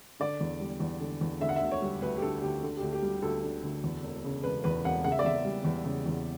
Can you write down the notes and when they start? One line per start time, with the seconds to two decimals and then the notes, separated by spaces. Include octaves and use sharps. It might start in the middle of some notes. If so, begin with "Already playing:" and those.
0.20 D3 D5
0.41 E2
0.60 G3
0.80 E2
1.00 D3
1.21 E2
1.41 D3 E5
1.49 F#5
1.56 E5
1.61 D2
1.71 C#5
1.82 G3
2.02 D2 B4
2.17 G4
2.22 D3 A4
2.42 D2 G4
2.63 D3
2.77 G4
2.82 D2
2.93 G4
3.02 G3
3.22 D2 A4
3.44 D3
3.63 D2
3.84 E2
4.03 E1
4.24 C#3
4.44 E1 B4
4.64 E2 B4
4.85 E1 F#5
5.04 C#3 F#5
5.12 E5
5.19 D5
5.24 E2 E5
5.45 G3
5.65 E2
5.85 C#3
6.06 E2